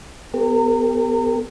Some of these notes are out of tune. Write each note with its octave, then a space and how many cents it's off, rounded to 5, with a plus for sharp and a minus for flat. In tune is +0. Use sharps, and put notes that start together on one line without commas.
B3 +15 G4 +30 A#4 -35